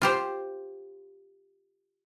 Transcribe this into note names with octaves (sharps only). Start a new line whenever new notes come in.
F4 G4 C5